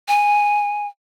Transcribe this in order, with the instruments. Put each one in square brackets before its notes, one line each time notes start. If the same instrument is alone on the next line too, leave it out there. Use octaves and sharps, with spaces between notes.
[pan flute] G#5